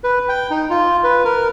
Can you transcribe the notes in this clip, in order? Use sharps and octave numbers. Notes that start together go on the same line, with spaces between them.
B4
G5
D#4
F4
B4
A#4